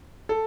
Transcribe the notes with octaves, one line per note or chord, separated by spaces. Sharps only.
A4